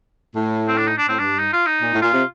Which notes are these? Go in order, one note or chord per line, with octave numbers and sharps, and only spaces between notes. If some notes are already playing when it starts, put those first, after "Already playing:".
A2
C4
D4
D#4
D4
A2 C4
G2 D4
D#4
F4
D#4
A#2
A2
A#2 F4
C3